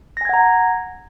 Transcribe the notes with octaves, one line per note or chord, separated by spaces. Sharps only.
F#5 G#5 A#5 G#6 A#6